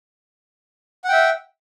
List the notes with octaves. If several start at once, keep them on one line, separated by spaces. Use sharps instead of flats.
E5 F#5 G5